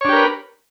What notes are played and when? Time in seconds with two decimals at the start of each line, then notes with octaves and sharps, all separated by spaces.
0.01 C#5
0.05 D4
0.09 G4
0.12 A#4
0.16 B4